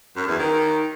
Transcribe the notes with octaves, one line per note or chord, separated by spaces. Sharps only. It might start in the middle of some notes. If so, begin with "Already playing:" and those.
F#2
E2
D#3